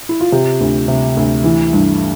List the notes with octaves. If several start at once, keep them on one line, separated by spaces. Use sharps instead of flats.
E4
F4
C3 G4
D2
C3
D2
E3
G2